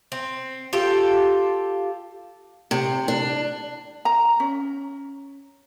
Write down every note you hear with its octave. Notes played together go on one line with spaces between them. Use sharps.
C4
F4 G4 A4
C3
D4
A#5
C#4